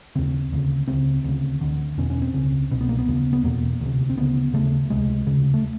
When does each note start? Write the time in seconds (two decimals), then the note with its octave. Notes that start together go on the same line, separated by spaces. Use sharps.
0.15 D#2 C#3 C4
0.52 D2 C#3
0.88 C#2 C#3 C4
1.24 D2 C#3
1.61 D2 D3
1.97 E2 B2 C#4
2.10 C#4
2.22 C4
2.34 C#2 C#3
2.71 C2 B2 C4
2.81 B3
2.89 A#3
2.99 B3
3.08 D#2 C#3
3.33 B3
3.44 E2 B2 A#3
3.81 D2 C3
4.10 C4
4.18 D2 C#3 B3
4.54 D#2 C#3 A3
4.90 C#2 C3 G#3
5.27 D#2 C#3
5.54 A3